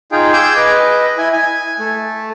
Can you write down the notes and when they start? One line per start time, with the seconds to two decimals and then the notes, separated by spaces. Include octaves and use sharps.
0.12 D#4 F4 G#4 G5
0.33 G#4 G5 G#5 D6 E6 G6
0.57 B4 D#5
1.18 E4 G#5
1.33 G#5
1.79 A3